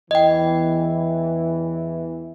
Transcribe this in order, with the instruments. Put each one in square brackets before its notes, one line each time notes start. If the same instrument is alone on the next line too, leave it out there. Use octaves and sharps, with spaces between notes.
[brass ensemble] E2 E3 [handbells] D#5 G5